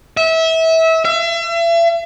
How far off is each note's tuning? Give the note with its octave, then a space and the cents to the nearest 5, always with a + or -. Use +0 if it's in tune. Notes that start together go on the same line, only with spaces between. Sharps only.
E5 -25
E5 +40